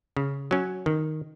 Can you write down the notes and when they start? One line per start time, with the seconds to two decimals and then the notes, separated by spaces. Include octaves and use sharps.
0.17 C#3
0.51 F#3 C#4
0.86 D#3